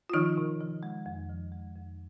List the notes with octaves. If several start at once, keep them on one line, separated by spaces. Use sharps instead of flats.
F4
D#3 F3 D#4
C3
F3
G#3
F2
F3
G#3
F2